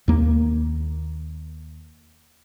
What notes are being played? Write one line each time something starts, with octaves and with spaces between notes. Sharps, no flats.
D#2 A#3